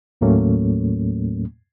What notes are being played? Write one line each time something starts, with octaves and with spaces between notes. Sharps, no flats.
D#2 A2 F#3 A3 A#3 C#4